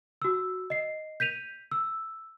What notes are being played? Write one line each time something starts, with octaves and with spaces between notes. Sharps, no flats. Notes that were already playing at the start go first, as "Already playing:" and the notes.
F#4 E6
D#5 C7
G6 B6 D#7 F7
E6